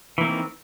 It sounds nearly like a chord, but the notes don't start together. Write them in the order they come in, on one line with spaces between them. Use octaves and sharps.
E3 A#3 C4 D#3